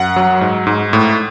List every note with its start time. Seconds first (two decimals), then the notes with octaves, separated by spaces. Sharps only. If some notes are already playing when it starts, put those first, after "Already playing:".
Already playing: F#2 F#5
0.16 F#3
0.41 G#2
0.67 G#2
0.93 A2